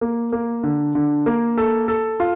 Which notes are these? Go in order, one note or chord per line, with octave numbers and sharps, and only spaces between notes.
A#3
A#3
D3
D3
A#3
A4
A4
F4